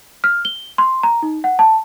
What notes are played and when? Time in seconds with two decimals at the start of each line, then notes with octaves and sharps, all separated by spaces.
0.24 F6
0.45 G7
0.78 C6
1.03 A#5
1.22 D#4
1.44 F#5
1.59 A5